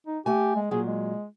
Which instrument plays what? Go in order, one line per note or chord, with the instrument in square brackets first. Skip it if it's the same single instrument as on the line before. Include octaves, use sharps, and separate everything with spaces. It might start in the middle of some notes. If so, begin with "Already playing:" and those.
[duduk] D#4
[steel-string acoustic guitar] A3 G#5 [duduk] G4
[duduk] G#3
[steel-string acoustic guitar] A#2 F#3 [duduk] G#4
[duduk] G#3